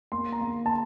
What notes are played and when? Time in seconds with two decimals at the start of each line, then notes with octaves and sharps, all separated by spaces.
0.12 A#3 C6
0.32 A#5
0.41 A#3
0.66 A5